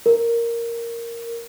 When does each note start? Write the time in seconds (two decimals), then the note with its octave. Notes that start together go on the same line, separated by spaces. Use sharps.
0.06 A#4